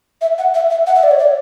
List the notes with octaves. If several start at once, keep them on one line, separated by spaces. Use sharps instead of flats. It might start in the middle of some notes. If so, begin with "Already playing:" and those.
E5
F#5
E5
E5
F#5
E5
D5
C#5
D5